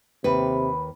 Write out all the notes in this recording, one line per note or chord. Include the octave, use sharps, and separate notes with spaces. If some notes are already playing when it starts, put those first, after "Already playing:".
D#2 C3 B4 B5